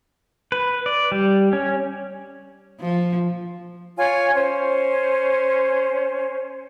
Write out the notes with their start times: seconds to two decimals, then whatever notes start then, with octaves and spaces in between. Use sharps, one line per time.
0.52 B4
0.86 D5
1.12 G3
1.53 C#4
2.81 F3
3.97 F4 C#5 G#5
4.35 C#4 C5